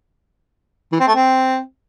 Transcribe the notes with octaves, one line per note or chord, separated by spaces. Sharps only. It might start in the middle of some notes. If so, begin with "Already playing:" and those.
E3
C4
A3
C4